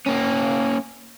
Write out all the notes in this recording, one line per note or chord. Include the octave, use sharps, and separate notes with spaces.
A#3 C#4